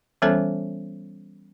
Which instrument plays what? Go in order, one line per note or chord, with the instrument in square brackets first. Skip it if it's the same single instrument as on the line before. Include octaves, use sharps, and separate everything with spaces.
[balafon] E3 G3 B3 C#4 A4 C5